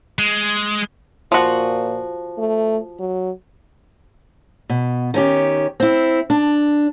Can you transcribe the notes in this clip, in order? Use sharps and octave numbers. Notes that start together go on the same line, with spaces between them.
G#3
A#2 F3 F#4
A3
F#3
B2
D#3 C#4 G4
C4 E4
D4